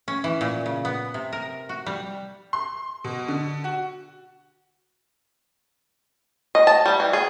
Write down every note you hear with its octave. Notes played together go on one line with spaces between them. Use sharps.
C#4
E3
A#2
C#3
B3
C3
A#4
F#4
G3
C6
B2
D3
F#4
D#5
A5
G3
E3
G#4